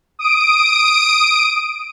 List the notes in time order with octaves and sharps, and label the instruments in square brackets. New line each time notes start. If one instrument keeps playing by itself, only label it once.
[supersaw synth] D#6 D7